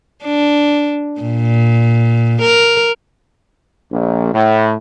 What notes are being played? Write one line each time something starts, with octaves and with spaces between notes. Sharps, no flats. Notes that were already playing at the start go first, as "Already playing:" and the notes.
D4
A#2
A#4
A#1
A2